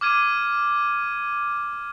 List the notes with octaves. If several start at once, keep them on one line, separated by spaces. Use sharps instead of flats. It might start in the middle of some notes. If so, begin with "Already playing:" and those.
D6 F6 G#6 D#7